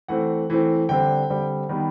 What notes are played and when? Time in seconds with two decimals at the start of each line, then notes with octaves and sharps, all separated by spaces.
0.08 E3 A3 C4 F#5
0.50 E3 A3 C4
0.89 D3 G3 C4 G5
1.30 D3 G3 C4
1.69 D#3 G3 B3